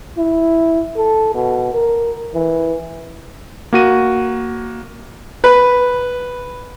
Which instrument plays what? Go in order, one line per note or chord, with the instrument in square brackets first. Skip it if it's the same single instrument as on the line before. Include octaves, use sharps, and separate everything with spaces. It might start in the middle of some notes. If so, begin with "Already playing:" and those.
[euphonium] E4
A4
B2
A#4
E3
[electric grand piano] A#3 F#4 D#7
[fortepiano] B4